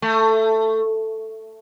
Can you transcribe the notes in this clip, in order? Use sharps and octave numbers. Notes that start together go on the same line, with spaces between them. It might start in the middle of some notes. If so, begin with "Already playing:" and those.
A3